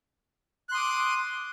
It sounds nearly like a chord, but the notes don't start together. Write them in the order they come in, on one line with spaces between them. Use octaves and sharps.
F#6 C6 D#6 D6